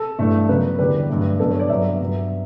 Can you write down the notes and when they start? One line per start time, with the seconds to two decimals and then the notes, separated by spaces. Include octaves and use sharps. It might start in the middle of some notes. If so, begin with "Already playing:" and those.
Already playing: A4
0.18 G2 E3 A3
0.48 C#3 F#3 B3 B4
0.79 E2 D3 G3 B4
1.09 G2 F#3 A3
1.39 G2 F#3 B3 A4
1.50 C#5
1.59 D5
1.69 G2 F#3 B3 E5
2.01 G2 F#3 B3